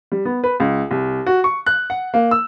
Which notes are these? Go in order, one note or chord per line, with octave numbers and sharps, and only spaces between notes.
G3
B3
B4
C#2
C2
F#4
C#6
F#6
F#5
A#3
E6